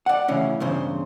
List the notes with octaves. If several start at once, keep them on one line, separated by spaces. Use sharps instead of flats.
D5 F#5
A2 C#3 E3 C#4
E2 G2 C#3 C5